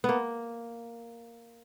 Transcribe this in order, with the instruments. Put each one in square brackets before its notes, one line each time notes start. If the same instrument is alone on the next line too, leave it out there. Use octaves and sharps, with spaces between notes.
[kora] A#3 B3